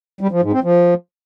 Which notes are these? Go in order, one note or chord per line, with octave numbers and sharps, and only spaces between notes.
G3
F3
G#2
C4
F3